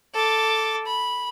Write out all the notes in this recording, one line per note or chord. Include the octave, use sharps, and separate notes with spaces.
A4 D6
B5